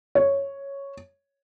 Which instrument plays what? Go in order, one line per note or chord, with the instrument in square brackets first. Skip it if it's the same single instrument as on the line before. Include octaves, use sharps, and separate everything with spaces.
[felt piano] C#5